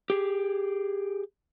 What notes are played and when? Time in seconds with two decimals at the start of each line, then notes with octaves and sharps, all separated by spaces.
0.10 G4 G#4